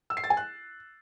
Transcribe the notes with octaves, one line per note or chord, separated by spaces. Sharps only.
E6
C7
A6
G#5
F#6